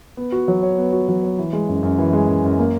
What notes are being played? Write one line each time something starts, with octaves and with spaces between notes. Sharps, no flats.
B3
F#4
F#3
C#5
B3
F#4
F#3
C#5
E3
G#3
F#2
F#2
E3
G#3
F#2
F#2
A#3